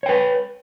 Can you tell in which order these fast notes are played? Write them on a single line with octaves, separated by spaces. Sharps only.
C#5 G5 B4